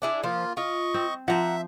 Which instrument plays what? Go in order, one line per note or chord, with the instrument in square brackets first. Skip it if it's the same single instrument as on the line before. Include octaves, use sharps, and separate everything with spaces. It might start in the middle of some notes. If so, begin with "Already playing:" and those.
[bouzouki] D4 E4 G#4
[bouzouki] F3 [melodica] A#3 F4
[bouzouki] F4 [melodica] D#5 C#6
[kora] C4
[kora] F3 C5 [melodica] E5 [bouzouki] F#5 A#5